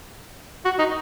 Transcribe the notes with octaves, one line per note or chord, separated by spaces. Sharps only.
F#4
D#4